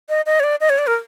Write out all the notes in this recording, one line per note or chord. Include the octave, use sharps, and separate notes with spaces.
D#5
D#5
C#5
D5
D#5
C#5
D5
A#4